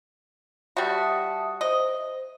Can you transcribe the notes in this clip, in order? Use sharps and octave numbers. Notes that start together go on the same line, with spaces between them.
G3 F#4 E5 A5 D#6
C5 D#5